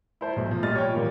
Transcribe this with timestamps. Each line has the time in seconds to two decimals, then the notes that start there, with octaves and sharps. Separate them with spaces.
0.21 E4 C5 A5
0.36 B1 A3
0.51 F3
0.63 A#2 G3 D#5 F6 A6
0.75 C#5 G5
0.93 A#2 D#3 G3 A#3